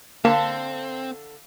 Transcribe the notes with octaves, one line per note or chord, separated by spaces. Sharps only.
D3 A#3 C4 F5 A5